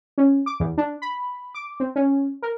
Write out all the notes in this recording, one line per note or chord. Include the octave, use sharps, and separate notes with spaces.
C#4
D6
E2
D4
B5
D6
C4
C#4
A#4